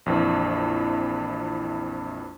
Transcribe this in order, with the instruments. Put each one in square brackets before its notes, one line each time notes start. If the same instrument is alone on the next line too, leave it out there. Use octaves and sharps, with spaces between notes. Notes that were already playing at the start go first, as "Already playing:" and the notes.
[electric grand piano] A#1 F2 E3